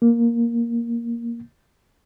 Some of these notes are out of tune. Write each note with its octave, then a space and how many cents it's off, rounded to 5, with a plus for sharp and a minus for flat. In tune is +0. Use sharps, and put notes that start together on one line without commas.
A#3 +5